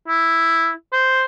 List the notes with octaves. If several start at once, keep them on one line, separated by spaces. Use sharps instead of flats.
E4
C5